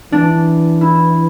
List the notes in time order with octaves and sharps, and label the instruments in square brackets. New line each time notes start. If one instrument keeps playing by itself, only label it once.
[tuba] E3 [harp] D4
[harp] E4